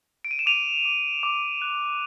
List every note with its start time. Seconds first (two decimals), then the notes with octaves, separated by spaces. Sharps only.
0.25 D7
0.31 D#7
0.39 E7
0.46 D6 D#7 F7
0.85 D6
1.23 D6
1.62 F#6